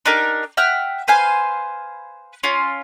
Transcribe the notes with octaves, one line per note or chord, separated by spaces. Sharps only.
D4 D#4 G4 A#4
E5 F#5 G5 F6
B4 C5 F5 G#5
C#4 F4